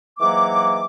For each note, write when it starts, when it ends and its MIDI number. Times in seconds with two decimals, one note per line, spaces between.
0.19 0.86 44
0.19 0.86 52
0.19 0.86 54
0.19 0.86 58
0.19 0.86 78
0.19 0.86 86